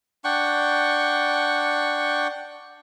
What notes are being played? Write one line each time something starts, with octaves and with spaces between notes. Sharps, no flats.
D4 F#5 G5 C#6